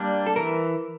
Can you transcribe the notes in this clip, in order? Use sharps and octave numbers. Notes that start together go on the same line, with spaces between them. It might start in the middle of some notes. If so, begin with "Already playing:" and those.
Already playing: G3 A#3 D4
A4
E3 A#4